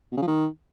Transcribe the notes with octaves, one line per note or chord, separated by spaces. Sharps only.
B2
C#3
F3
D#3